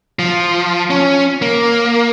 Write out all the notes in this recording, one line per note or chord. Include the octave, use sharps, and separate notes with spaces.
F3
C#4
A#3